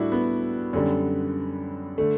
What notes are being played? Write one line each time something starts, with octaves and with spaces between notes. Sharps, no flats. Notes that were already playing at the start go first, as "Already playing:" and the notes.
Already playing: A2 G3 D4 E4 F#4
B3
F#2 D3 G3
D3 A3